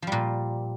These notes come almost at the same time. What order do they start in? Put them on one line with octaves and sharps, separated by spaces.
F3 G3 A#2